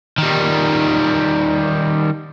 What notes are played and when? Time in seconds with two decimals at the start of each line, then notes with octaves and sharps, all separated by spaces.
0.18 D#3 G3